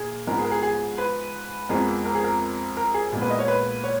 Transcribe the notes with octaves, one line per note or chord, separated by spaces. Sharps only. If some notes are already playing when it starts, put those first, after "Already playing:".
Already playing: A#2 G#4
G#2 F3 G#3 B3 A#4
G#4
A#4
G#4
G#4
B4
F2 F3 G#3 B3 A#4
A#4
G#4
A#4
A#4
G#4
A#2 G#3 B3
B4
D#5
C#5
B4
C#5